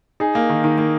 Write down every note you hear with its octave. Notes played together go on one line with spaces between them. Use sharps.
D#4 G#4
A#3
D#3
D#3
A#3